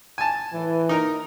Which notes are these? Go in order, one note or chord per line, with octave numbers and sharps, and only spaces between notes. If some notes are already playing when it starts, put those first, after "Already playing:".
G#5 A5
A2 E3
D#4 A#4 A#5